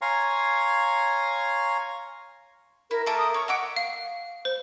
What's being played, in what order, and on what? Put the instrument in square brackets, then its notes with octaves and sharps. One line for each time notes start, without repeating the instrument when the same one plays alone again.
[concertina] C#5 F5 G#5 A#5 C6 C#6
[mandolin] E4 [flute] A#4
[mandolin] A3 A#3 A#4 [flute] A5
[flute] D#6
[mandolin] C#4 [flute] C#6
[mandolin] D#5 E5 D6 [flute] F#5
[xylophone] F5
C5